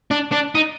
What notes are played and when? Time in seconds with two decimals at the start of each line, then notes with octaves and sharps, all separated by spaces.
0.11 D4
0.32 D4
0.55 D#4